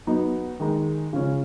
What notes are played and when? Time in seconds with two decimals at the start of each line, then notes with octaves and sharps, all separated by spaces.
0.07 F#3 B3 D#4
0.60 D#3 G#3 D#4
1.13 C#3 F3 G#3 C#4